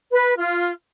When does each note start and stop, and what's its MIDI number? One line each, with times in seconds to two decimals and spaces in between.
0.12 0.33 71
0.38 0.71 65